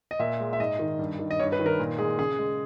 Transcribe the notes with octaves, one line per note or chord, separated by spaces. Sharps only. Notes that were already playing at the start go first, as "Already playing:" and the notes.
D#5
A#2 E5
G#3
E5
G#2 D#5
D#3
G2
D#3
D#5
G2 C#5
B4
D#3
A#4
A#2
G#3 G#4
C#3 G#4
G#3